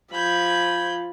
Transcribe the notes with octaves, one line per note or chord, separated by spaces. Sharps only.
F3 B5 G6 G#6